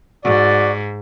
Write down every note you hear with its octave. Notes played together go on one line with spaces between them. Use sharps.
G#2 F#4 D5